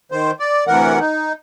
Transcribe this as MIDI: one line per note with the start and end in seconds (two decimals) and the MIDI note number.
0.12 0.31 51
0.12 0.31 72
0.40 0.64 74
0.67 0.99 38
0.67 0.99 48
0.67 0.99 52
0.67 0.99 70
0.67 0.99 78
1.00 1.33 63